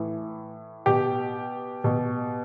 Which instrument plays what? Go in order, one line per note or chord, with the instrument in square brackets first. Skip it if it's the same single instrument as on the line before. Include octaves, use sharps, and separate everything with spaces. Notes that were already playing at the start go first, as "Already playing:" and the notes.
Already playing: [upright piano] A2 E3
B2 G4
B2